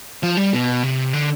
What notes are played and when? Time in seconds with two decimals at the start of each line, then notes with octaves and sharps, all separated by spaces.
0.23 F3
0.37 G3
0.53 B2
0.83 C3
1.13 D3